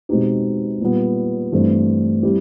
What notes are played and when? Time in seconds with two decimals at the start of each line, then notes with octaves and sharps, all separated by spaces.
0.09 B2 G#3 C4 D#4 G4
0.80 A#2 G3 B3
1.52 G2 E3 A3 C4
2.23 G3 C4 E4 G4